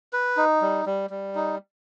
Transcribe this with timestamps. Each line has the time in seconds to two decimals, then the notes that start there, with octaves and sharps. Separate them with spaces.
0.13 B4
0.37 D#4
0.61 G3
0.86 G3
1.10 G3
1.35 D#4